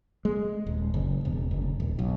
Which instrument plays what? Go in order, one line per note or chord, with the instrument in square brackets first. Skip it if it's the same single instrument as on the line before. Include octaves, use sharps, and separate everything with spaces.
[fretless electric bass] G#3
D#1
F#1
E1
F#1
D#1
B1